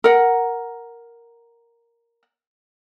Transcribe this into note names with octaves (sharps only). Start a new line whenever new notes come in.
A#4 F#5